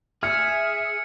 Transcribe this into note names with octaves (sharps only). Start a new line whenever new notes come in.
G#4 E5 F6 G#6 C#7